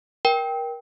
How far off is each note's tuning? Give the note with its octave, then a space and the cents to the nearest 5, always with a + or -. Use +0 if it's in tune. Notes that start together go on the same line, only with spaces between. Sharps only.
A#4 +25 G5 +0